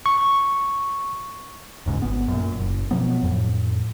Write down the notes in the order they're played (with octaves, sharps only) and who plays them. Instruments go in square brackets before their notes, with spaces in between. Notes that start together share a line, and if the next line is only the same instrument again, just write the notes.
[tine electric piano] C#6
[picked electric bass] D#1 G#2 C#3
G#1 B3
F#2 A#2
F#1
B2 F3 F#3 B3
F2 A2